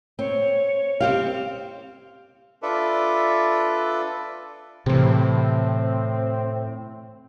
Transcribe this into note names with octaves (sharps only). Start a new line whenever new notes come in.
C4 C#5
C4 G4 F5
D4 F4 A4 B4 D5 E5
A2 C3 E3 C4